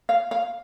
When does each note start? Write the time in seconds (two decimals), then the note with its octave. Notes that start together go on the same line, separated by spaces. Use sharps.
0.09 F5
0.31 F5